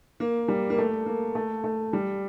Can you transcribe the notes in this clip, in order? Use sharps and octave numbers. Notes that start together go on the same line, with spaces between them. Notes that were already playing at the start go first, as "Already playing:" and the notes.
A#3
G3
A#3
A3
A#3
A3
A3
G3